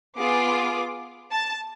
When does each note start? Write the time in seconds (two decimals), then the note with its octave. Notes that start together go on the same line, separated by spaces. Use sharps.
0.16 B3 F4 G#4 D6
1.31 A5